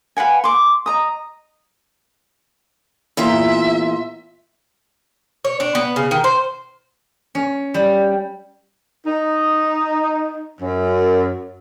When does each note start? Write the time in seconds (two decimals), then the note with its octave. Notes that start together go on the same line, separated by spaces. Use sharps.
0.17 B4 F5 F#5 G#5
0.44 C6 D6
0.86 D#5 A#5 D#6
3.17 E2 A#2 F4 E5
5.45 C#5
5.60 D4
5.75 B3
5.96 C#3
6.11 D#3
6.24 C5
7.35 C#4
7.74 G3
9.05 D#4
10.61 F#2